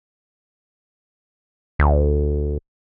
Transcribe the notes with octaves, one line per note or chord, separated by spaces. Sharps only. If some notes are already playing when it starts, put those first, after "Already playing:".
D2